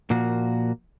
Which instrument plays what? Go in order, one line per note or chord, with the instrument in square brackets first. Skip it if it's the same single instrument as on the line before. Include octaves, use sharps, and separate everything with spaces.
[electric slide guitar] A#2 F3 A#3 F#4